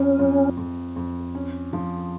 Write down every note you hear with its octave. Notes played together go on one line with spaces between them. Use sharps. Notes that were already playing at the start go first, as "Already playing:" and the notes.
Already playing: F2 C#4
F2
F2
F2
C#4
F3